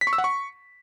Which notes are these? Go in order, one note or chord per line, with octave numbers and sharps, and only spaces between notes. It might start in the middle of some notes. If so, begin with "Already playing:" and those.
B6
C#6
E6
F#5
C#6